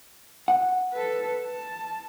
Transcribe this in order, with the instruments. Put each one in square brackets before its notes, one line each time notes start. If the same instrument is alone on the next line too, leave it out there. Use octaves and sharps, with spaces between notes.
[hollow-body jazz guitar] F#5
[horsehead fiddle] A4 B4
A5